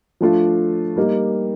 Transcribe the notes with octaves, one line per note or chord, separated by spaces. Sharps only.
F3 A3 D4 F4
G3 A#3 D#4 G4